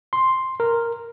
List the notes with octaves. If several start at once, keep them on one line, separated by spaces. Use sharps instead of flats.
C6
A#4